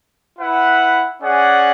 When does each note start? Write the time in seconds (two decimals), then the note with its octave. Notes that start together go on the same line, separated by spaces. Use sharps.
0.39 E4 B4 F#5
1.22 C#4 G#4 D5 F#5